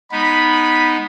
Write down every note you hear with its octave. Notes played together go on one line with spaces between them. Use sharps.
G#3 B3 D#4 B5